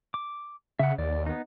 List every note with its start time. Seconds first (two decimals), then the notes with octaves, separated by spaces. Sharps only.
0.14 D6
0.79 C#3 E5 F#5
0.98 D#2 D5
1.26 B3 D#4